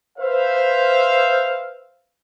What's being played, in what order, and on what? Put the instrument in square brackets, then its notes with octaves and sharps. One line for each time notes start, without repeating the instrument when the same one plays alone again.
[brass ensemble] B4 C5 E5 F5